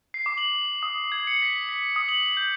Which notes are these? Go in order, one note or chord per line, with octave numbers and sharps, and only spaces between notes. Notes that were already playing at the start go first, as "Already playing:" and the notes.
C7
D6
F#7
D#6
G#6
C#7
B6
B6
D#6
F#7
G6